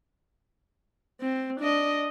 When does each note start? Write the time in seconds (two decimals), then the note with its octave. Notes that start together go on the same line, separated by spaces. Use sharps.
1.21 C4
1.60 D4 D#5